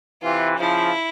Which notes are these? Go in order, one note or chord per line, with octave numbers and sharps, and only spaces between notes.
C3 E3 F4
C#3 F3 E4